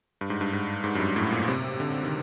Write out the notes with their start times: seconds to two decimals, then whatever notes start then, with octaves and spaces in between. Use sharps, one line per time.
0.21 G2
0.30 G#2
0.41 G2
0.53 G#2
0.84 G#2
0.95 F#2
1.00 G2
1.16 A2
1.32 A#2
1.48 C3
1.80 D3
2.04 D#3